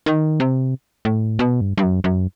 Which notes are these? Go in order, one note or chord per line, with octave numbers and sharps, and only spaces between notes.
D#3
C3
A2
B2
G2
G2
F#2
F#2